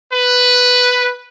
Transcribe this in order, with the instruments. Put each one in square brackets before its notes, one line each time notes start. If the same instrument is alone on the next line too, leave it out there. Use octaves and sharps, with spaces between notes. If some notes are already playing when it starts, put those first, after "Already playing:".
[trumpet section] B4